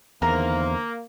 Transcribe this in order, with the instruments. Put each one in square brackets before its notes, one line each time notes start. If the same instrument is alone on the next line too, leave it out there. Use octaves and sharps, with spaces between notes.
[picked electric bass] E2 [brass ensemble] D3 D#3 C5 [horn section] A#3 [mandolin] A#4